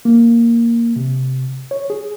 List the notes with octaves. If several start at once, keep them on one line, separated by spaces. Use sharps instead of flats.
A#3
C3
C#5
G#4